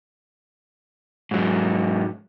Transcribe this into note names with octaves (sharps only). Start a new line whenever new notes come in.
G#2 F#3